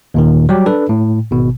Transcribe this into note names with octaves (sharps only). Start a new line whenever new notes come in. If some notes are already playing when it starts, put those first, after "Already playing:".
D#2 A#2 D#3
F#3 G3 G4
D4 A4 B4
A2
G#1 B2